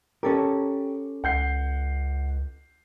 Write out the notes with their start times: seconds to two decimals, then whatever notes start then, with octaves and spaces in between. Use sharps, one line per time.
0.23 C#4 G4 A4 A#4
1.24 C#2 F#5 G6 C7